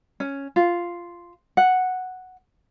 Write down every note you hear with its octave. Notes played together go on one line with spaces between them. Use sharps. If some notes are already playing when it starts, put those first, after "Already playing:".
C#4
F4
F#5